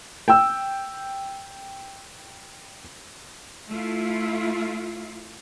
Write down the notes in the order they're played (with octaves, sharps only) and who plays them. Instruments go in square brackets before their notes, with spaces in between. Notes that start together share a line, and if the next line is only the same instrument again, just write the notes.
[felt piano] G5 E6
[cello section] A3 E4 F4